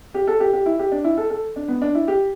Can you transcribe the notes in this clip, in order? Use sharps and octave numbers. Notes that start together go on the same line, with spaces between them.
G4
A4
G4
G4
E4
G4
D4
E4
A4
A4
D4
B3
D4
E4
G4